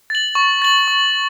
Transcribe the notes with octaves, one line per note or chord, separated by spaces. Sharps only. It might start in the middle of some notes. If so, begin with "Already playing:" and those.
A6 F#7
C#6
A6 F#7
C#6